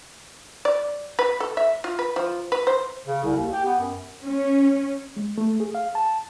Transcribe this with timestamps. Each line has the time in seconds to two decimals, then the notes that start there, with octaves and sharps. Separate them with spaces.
0.65 D5
1.19 B4
1.40 A4
1.57 E5
1.84 F4
1.99 B4
2.16 F3
2.52 B4
2.67 C5
3.07 C#3
3.24 C2
3.37 D#2
3.53 G4
3.65 B3
3.80 F#2
4.24 C#4
5.16 G#3
5.38 A3
5.60 G#4
5.75 F5
5.95 A5